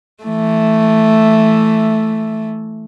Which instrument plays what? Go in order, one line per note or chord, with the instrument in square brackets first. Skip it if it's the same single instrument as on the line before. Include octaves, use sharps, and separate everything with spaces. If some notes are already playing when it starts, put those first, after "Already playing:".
[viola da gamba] E3 A3